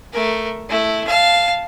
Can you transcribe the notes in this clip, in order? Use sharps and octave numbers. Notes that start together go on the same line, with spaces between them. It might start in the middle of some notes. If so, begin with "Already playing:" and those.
A3 A#4
A3 E4
F5 A5